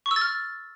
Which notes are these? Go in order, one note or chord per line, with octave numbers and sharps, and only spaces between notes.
C#6
E6
A6
F6